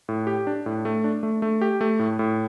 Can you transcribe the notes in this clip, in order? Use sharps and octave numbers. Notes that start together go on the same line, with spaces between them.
A2
G4
D4
A2
A3
D4
A3
A3
G4
A3
A2
A2